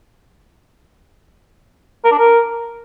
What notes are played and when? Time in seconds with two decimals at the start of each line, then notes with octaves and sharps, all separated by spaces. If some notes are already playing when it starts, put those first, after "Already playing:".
2.04 A#4
2.11 D4
2.18 A#4